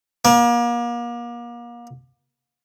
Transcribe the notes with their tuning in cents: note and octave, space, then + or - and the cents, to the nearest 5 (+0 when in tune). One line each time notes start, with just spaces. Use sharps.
A#3 +35